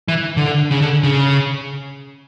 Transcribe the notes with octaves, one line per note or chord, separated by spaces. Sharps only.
E3
D3
C#3
D3
C#3